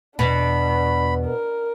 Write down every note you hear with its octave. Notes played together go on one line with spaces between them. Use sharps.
E2 B2 D4 B5
A#4